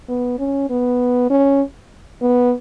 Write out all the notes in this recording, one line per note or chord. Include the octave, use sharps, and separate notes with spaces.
B3
C#4
B3
C#4
B3